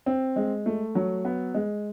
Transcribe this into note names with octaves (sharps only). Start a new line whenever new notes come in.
C4
G#3
A3
F#3
B3
G#3